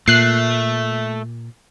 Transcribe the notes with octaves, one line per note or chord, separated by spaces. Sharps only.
A#2 A3 F#6 C7